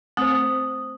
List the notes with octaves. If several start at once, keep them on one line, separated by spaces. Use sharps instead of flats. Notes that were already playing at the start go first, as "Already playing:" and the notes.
A3 C4 C5 D#6